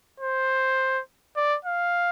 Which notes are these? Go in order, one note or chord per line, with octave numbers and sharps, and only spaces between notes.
C5
D5
F5